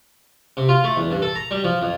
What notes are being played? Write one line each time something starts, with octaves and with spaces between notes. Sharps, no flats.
C3
F4
A3
E2
G2
A4
A#5
G3
F3
F2